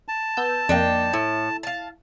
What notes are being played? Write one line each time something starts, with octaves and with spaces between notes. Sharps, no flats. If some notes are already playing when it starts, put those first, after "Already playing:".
A5
B3 E6 G6
F2 A#3 D4 D#4 G5
A2 E4
F5 A5